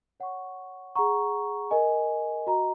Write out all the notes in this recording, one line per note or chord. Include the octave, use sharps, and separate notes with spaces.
C#5 F#5 C#6
G#4 F#5 A#5 C#6
A#4 D#5 G#5
F#4 D#5 A#5